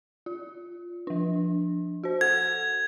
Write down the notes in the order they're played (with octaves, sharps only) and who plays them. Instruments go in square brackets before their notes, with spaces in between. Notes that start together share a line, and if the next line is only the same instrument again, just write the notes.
[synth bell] F4
F3 D4
F#4 C5
[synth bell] A4 F#5 [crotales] G#6